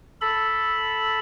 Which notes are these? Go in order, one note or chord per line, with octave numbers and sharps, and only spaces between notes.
A4 B5